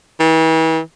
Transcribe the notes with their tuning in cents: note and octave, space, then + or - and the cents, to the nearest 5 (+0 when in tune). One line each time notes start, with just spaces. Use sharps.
E3 -35